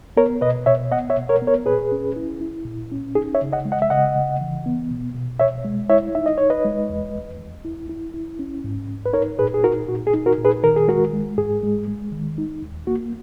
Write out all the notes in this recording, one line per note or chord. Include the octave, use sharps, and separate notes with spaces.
B3 A#4 C#5
B2 B4 D#5
B2 C#5 E5
B3 D#5 F#5
C#5 E5
B2
A#4 C#5
B3
A#4 C#5
A#2 G#4 B4
C#4
E4
E4
A#2
C#4
D#4 G#4
C#5 E5
C#3
D#5 F#5
G#3
D#5 F#5
E5
C#3 D#5 F#5
C#3
E3
B3
B2
B2
B2 C#5 E5
G#3
E4 C#5 E5
D#4 E5
D#5
D#4 C#5
B4 D#5
G#3
E2
E2
E2
E4
E4
E4
C#4
G#2
G#2
B4
D#4 A#4 C#5
A#2 G#4 B4
G#4
D#4 F#4 A#4
A#2 F#4
G#4
D#4
F#4 A#4
A#2
G#4 B4
D#3 A#4
G#4
G#3 F#4 A#4
G#3
G#2 G#4
G#3
G#3
D#3
D#4
D#2
A#3 F#4